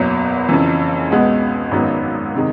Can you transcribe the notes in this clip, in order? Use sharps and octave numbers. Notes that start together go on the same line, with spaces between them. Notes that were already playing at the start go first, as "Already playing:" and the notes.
Already playing: F#1 E2 B2 F#3
F2 C#3 E3
C#2 B2 G#3 B3
G#1 F#2 D#3 G#3 B3
C3 D#3 G#3